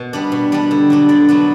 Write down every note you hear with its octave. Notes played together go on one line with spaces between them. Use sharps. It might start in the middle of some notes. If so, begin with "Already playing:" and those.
Already playing: B2
G3 B3 D4
B2
G3 B3 D4
D3
F#3 B3 D4
D3 D5
F#3 B3 D4